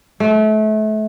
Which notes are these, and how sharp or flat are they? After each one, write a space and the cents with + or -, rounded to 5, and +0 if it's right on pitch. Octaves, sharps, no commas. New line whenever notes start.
A3 -30